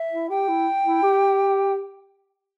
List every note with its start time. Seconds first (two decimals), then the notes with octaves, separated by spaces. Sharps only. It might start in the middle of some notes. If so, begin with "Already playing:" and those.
Already playing: E5
0.12 E4
0.30 G4 G5
0.48 E4
0.85 E4
1.03 G4